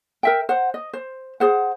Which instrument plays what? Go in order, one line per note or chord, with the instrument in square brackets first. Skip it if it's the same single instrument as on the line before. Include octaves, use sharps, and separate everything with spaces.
[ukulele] A#4 E5 G5
C5 F#5
D#5
C5
G#4 C5 F#5